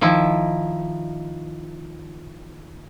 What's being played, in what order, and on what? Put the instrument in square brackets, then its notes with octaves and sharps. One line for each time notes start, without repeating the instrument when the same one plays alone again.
[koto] D#3 F3 E4